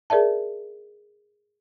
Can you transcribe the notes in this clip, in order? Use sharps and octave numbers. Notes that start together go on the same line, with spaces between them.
G#4 A#4 D5 E5 A5